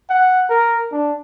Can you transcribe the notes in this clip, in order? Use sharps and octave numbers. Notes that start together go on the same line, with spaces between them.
F#5
A#4
D4